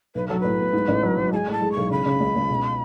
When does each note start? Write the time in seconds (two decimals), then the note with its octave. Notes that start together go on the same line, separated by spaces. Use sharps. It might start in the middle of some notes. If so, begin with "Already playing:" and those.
0.15 B1 B4
0.28 F#3 A4
0.40 A2 B4
0.59 B3
0.73 G#2
0.88 A1
1.03 F#3
1.17 F#3
1.32 G#3 G#5 A5
1.47 A2 A5
1.62 G#3
1.72 C#6
1.77 B1
1.90 C#3 B5
2.06 C#3
2.20 C#2
2.36 C#2
2.50 B2